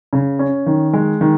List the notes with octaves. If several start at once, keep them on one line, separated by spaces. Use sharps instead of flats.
C#3
C#4
D#3
G#3
D#3